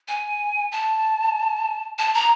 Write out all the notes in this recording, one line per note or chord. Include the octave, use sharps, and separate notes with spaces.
G#5
A5
A5
A#5